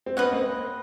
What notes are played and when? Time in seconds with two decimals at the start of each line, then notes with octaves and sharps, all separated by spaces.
0.06 C4
0.17 B3 C#4 B4 D#5 F#5
0.33 A#3 C4